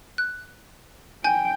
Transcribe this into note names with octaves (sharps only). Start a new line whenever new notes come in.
F#6
G5 G#5 G6